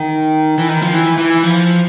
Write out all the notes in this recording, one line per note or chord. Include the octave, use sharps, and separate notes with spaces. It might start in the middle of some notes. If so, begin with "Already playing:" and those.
Already playing: D#3
E3
D#3
F3
E3
E3
F3